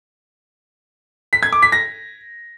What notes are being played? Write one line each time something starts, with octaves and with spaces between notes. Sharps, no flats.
B6
G#6
D6
B6
A#6